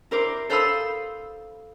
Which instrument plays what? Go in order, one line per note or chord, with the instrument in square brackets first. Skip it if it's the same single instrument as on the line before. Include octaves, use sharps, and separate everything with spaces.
[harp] E4 A#4 C5 D6
A4 C5 F5 B5 D#6 E6